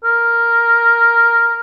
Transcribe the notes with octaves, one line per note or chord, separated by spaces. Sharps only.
A#4